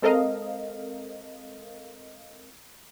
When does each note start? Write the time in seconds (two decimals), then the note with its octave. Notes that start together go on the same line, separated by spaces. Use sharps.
0.02 G#3 C4 A4 A#4 D#5 F5